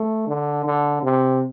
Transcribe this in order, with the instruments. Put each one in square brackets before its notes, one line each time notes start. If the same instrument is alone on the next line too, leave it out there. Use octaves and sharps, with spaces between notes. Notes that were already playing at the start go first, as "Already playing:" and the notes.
Already playing: [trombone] A3
D3
D3
C3